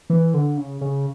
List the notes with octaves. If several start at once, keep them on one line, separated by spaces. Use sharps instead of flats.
E3
D3
C#3
C#3